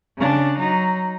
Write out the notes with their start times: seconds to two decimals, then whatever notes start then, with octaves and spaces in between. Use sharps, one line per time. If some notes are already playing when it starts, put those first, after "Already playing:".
0.18 C#3 D4
0.59 F#3 D#4